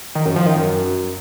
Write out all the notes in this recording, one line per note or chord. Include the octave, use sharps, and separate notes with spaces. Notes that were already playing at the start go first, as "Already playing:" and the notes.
D#3
F#2
F3
D#3
F#2